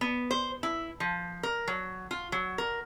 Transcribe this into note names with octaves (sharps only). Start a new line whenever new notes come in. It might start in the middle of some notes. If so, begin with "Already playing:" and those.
B3
C5
E4
F3
A#4
F#3
F4
F#3
A#4